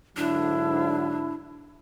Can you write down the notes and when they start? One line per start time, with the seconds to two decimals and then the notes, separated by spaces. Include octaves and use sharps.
0.17 G#2 D3 F#3 D4 E4